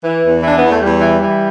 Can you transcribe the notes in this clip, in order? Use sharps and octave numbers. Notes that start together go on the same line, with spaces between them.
E3
E2
E3 D4
E2 B3
A3
E2 G3
E3
E3